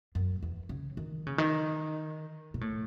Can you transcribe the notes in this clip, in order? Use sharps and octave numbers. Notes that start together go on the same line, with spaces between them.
F#2
E2
C#3
D#3
C#3
D#3
B2
A2